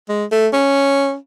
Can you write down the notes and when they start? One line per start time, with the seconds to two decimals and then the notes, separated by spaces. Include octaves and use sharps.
0.09 G#3
0.32 A3
0.53 C#4